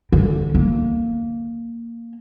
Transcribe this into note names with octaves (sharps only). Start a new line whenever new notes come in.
D3
A#3